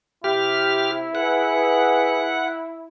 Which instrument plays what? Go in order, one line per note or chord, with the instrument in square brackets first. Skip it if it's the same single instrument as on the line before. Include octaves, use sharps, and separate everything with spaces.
[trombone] C3 [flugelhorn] E4 [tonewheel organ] G4 F6
[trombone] G#4 [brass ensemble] B4 [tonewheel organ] F#5